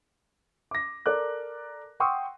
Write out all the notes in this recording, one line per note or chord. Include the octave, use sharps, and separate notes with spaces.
D6 A#6
A4 A#4 D5 D6 F#6
F#5 G5 C6 C#6 D#6 E6